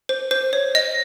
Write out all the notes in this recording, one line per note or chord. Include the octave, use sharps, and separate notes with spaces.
C5
C5
C#5
D#5